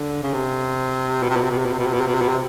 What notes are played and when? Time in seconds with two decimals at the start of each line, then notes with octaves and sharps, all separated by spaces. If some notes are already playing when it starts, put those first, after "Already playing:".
Already playing: D3
0.23 C#3
0.33 C3
1.23 B2
1.30 C3
1.36 B2
1.43 C3
1.51 B2
1.58 C3
1.65 B2
1.73 C3
1.79 B2
1.87 C3
1.93 B2
2.00 C3
2.07 B2
2.14 C3
2.21 B2
2.29 C3